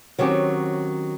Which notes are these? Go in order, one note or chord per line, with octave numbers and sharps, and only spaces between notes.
D#3 F#3 C4 C#4 G4